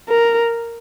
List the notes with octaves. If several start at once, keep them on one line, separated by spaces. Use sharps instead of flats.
A#4